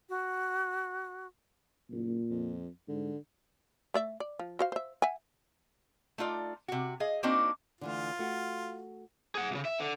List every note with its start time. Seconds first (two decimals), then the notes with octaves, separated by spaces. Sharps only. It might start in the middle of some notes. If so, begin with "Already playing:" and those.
0.09 F#4
1.91 F#1 A#2
2.30 F2
2.88 G#2 D3
3.94 A3 D5 E5
4.20 D5
4.39 F3
4.59 F#4 C5 F5
4.72 C5 E5
5.02 E5 F#5 G#5
6.18 A3 D#4 F4 D5
6.68 C3 F#4
7.00 G#4 D#5 F5
7.23 A#3 C4 D4 D#4 F#4
7.81 D3 E3 A3 F4
8.19 A3 F#4
9.35 G#4 F#5
9.51 C#2 C#3
9.65 E5
9.79 D3